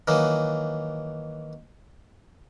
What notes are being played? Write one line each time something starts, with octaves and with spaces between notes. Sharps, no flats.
D#3 E3 F#3 A#3